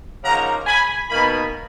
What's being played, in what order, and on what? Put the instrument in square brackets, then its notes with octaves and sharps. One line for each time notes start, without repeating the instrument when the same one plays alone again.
[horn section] C#3 F3 A#3 D#4 F#5 A#5
G#5 B5
B2 A#3 D#4 G#5 B5